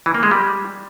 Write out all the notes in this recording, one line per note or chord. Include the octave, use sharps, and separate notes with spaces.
E3
A#3
G#3
G3